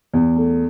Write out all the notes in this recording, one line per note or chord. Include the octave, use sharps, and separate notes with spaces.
E2
A3